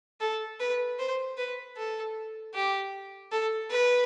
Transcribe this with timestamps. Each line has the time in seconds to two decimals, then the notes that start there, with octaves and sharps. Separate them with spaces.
0.20 A4
0.60 B4
0.99 C5
1.37 B4
1.77 A4
2.54 G4
3.32 A4
3.71 B4